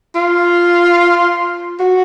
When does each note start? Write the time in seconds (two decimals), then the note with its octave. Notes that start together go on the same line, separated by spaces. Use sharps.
0.16 F4
1.80 F#4